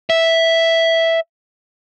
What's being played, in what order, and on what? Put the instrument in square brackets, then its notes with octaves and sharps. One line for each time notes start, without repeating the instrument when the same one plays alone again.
[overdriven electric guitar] E5